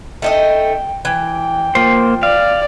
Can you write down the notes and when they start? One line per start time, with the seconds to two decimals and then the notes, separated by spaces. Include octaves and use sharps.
0.22 A3 D#4 D#5 G5
1.05 E3 G5
1.75 F3 A#3 C5
2.23 D5 F5